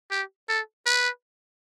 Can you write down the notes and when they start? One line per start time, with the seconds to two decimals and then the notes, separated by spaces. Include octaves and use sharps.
0.11 G4
0.49 A4
0.86 B4